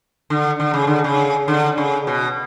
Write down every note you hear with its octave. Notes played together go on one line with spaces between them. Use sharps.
D3
D3
C#3
D3
C#3
D3
C#3
B2